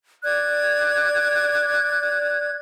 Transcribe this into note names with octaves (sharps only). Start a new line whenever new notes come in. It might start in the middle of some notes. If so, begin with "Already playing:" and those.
D5 F#6 G#6